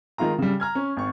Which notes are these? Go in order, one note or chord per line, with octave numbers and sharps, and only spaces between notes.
D#3 G#3 D#4 F4 A#5
C#3 G3
A#5 F6 G#6
C#4
G#1 C#6